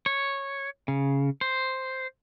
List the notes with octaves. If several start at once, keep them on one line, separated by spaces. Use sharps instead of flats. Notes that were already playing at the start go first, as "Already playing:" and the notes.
C#5
C#3
C5